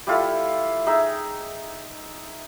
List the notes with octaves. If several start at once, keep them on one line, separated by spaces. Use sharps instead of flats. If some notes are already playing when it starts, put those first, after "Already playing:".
G3 E4 F4 A4
D#4 G#4 E5